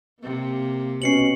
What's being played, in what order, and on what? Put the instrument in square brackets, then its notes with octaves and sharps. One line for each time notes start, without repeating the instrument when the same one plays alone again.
[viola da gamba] C3 A#3
[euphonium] B2 [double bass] C#4 [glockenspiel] C7 C#7 F#7